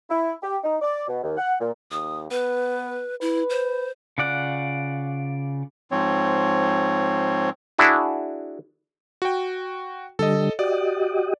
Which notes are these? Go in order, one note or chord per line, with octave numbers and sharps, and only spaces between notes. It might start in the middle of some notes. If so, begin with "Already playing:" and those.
E4
G4
D#4
D5
B2
D#2
F#5
A#2
D#2 D#6
B3 B4
E4 B4
C5
C#3 F4 D5 F#5
G#2 F3 C4 C#5
D4 E4 F#4 G#4
F#4 G5
D3 G3 A4 D#5
F#4 G4 D5 D#5